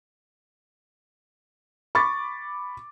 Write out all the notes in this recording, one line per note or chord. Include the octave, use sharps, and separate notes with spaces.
B5 C#6 D6 A6